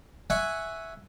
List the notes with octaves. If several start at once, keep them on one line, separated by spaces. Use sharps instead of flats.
E5 F#5 G#5 C#6